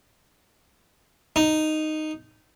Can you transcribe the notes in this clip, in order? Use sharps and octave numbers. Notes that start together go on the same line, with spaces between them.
D#4